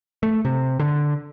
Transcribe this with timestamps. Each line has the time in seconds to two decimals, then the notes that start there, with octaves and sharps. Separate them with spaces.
0.23 A3
0.45 C3
0.80 D3